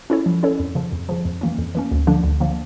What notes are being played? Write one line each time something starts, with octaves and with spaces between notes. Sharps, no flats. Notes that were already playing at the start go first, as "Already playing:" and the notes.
C#4 E4 A4 C#5
F3
C#4 E4 A4 C#5
F2
C#3 F3
F2
C#3 F3
F2
E3 A#3 C#4
F2
E3 A#3 C#4
D2
D3 F3 A#3 D4
D2
D3 F3 A#3 D4